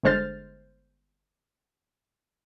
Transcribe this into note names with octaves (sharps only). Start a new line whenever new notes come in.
G1 D3 G#3 C5 F6 A6